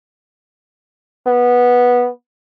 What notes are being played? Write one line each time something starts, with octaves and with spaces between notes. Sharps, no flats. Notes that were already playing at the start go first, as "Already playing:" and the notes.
B3